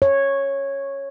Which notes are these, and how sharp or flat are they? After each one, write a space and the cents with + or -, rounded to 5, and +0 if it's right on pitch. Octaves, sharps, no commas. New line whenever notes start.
C#5 -10